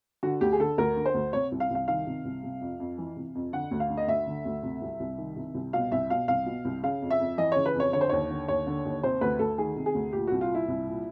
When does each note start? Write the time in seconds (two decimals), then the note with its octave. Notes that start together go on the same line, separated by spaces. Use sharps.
0.23 D3 F#4
0.41 D2 G4
0.53 G#4
0.60 D3 A4
0.78 D2 A#4
0.96 D3
1.06 C5
1.14 D2
1.33 C3 C#5
1.52 C2
1.60 F5
1.70 C2 F5
1.88 D#3 F5
2.06 C3
2.25 C2
2.43 C3
2.61 F2
2.80 F2
2.98 E3
3.16 C3
3.35 F2
3.53 D3 F#5
3.71 D2
3.80 F5
3.90 D3
3.97 D#5
4.08 D2 E5
4.27 D3
4.45 D2
4.63 C3
4.81 C2
5.00 C2
5.18 D#3
5.36 C3
5.54 C2
5.73 B2 F5
5.92 C2 E5
6.10 B2 F5
6.28 C2 F5
6.46 B2
6.65 C2
6.83 C#3 F5
7.02 F2
7.10 E5
7.20 F2
7.38 E3 D#5
7.52 C#3 C#5
7.66 B4
7.75 F2
7.80 C#5
7.93 D3 C#5
8.01 C5
8.09 D#2 C#5
8.30 D3
8.48 D#2 C#5
8.67 D3
8.85 D#2
9.03 C3 C5
9.21 D2 B4
9.39 D2 A4
9.58 D#3 G#4
9.76 C3
9.86 G#4
9.95 D2
10.13 A#2 G4
10.27 C2 F#4
10.41 F4
10.50 A#2 E4
10.68 C2
10.87 A#2